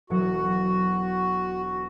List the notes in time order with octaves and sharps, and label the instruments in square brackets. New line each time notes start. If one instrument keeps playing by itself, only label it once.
[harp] E1 F#3 C#7 [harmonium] F#4